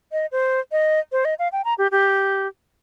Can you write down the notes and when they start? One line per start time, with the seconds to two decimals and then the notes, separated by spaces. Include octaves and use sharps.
0.12 D#5
0.32 C5
0.72 D#5
1.12 C5
1.25 D#5
1.39 F5
1.52 G5
1.65 A#5
1.78 G4
1.92 G4